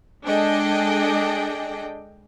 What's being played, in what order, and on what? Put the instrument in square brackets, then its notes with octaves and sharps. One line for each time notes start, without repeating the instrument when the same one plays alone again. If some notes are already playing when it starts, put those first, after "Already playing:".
[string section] G#3 D4 G#4 A4 D#5 G5